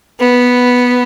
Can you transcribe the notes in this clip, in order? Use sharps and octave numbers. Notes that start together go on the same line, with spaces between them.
B3